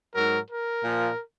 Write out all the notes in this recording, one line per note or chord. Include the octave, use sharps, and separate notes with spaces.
G#2 F#3 A#4
A#4
A#2 F3